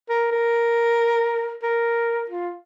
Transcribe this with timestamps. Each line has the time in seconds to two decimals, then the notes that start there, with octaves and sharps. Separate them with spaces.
0.09 A#4
0.31 A#4
1.63 A#4
2.29 F4